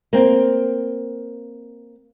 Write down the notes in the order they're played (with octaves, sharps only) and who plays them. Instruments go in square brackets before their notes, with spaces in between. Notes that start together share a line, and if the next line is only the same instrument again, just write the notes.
[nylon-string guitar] A#3 C4